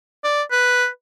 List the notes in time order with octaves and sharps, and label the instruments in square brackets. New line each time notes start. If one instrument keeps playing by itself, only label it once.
[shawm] D5
B4